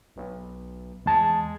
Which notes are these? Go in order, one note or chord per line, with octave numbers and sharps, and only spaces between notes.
B1
E2 G#3 A5